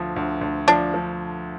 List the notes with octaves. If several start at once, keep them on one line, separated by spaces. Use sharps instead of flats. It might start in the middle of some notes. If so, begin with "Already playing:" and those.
Already playing: D2 D3 F3
D2
D2
F3 D4
F3